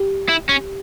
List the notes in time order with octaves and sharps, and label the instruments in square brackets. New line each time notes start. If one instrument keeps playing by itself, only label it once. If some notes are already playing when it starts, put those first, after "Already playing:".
Already playing: [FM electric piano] G4
[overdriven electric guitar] E4
C#4